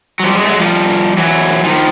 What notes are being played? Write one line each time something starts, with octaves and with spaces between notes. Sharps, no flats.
F#3
F3 G3
F#3 G#3
A3
F#3 G#3
F3 G3
E3 F#3
D#3 F3